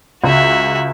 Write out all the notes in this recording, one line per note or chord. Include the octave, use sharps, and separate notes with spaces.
C#2 F#4 E5